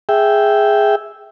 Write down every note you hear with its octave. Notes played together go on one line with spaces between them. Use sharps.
G#4 E5 G5